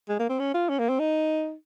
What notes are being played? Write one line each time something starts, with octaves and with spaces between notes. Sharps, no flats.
G#3
A#3
C4
C#4
F4
C#4
A#3
C4
D#4